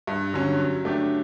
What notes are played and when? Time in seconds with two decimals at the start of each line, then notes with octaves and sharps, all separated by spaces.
0.07 G2
0.33 D3 F#3 C#4
0.59 F#3
0.85 A3 D4 G4